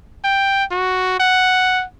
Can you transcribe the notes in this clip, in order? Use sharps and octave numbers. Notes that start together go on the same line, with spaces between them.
G5
F#4
F#5